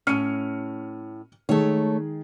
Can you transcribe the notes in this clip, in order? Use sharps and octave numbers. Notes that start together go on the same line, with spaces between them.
A2 C#4 F6 C#7 D#7
D#3 G#3 A3 G#4 C#5